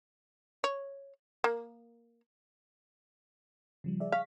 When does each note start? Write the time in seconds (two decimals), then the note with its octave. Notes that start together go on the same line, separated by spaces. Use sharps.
0.64 C#5
1.44 A#3
3.84 C#3 F3 G3
4.00 G#4 D5 E5
4.12 F5 C#6 B6